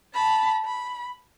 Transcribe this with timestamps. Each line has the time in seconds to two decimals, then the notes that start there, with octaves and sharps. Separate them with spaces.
0.14 A5 B5
0.65 B5